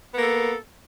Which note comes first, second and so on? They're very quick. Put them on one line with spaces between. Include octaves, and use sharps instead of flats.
B3 A#3 A4